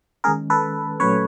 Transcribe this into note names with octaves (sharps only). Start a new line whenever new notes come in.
D#3 G#3 C#4 G#4 A#4
A4 B4
A#2 F#3 A3 C#4 B4 C#5